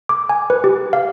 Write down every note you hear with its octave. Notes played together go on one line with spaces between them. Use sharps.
D6
G#5
B4
G4
F5